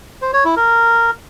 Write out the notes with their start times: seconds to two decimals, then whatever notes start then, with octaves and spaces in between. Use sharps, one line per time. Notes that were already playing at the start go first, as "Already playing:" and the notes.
0.22 C5
0.33 C#5
0.45 E4
0.56 A#4